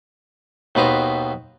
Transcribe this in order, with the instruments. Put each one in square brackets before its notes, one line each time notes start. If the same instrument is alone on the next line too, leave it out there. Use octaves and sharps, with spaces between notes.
[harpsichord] D#2 B2 B4 C5 A#5